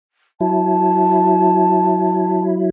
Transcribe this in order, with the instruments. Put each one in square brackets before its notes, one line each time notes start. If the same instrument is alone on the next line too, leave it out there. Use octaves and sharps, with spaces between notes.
[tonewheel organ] F#3 E4 [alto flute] A5